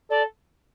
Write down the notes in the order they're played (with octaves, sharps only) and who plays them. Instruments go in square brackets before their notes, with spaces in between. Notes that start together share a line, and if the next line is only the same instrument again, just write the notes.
[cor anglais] A4 [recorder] D5